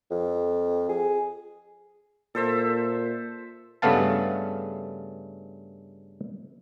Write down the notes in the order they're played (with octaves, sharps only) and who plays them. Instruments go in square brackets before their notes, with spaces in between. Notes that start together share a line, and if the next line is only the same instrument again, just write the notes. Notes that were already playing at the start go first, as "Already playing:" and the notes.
[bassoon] F2
G#4
[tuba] A#2 [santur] A4 C5 E5
[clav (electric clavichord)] G2 C#3 A3 B3 F5 A5